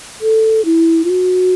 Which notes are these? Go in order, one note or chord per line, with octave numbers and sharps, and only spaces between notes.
A4
E4
F4
F#4